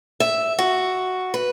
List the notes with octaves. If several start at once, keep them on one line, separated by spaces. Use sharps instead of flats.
E5
F#4
B4